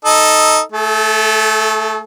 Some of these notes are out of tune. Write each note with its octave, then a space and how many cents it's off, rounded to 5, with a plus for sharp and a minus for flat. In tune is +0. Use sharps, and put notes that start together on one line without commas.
D#4 +0 A4 +0
A3 +0 A4 -45